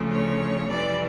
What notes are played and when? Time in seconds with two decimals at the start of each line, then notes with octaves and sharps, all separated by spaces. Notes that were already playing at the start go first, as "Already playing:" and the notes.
Already playing: D2 C#3 F3 A3
0.12 C#5
0.69 F2 C3 E3 G3 D5